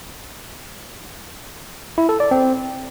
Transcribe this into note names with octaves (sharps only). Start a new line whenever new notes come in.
E4
A4
D5
C4